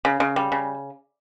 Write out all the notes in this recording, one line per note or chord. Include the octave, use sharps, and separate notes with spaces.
C#3
C#3
G3
C#3